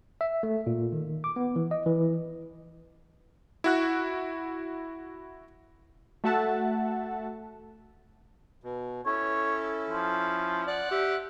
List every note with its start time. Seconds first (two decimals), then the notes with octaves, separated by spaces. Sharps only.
0.21 E5
0.43 A3
0.67 A#2
0.92 D#3
1.24 D6
1.36 B3
1.56 E3
1.71 D#5
1.86 E3
3.64 E4 F#4 F#6
6.24 A3 F#4 E5 F#5 A5
8.63 B2
9.06 C#4 E4 A4 C#5
9.89 F3
10.67 D5 F#5 F#6
10.91 G4 E5